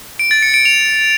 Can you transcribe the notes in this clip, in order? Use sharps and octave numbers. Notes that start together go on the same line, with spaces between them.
D7
A6
C#7
D7
F7